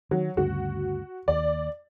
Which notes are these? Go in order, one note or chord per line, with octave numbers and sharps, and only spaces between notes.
D#3 F#3
D2 G2 C#3 F#4
D#2 D5